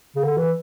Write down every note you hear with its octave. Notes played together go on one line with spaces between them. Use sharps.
C#3
D3
E3